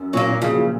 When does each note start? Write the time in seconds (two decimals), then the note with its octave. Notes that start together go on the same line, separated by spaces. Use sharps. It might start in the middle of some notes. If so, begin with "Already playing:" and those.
Already playing: F#2
0.13 A#2 F#3 A#3
0.28 A#2
0.42 C#3 F3
0.50 F#3
0.58 F3